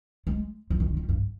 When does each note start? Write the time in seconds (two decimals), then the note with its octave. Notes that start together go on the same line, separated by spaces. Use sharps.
0.27 G#3
0.70 F3
0.80 D#3
0.88 D3
0.97 F2
1.09 G2